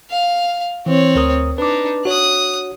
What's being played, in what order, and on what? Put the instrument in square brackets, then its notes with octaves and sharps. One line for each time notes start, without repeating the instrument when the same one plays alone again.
[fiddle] F5
[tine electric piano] E3 [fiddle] C4 C#5
[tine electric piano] D2 A#4 D#6
[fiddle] D4 D#4 [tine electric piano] B4 D6
[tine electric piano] F#4 C#5 [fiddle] D#6 F#6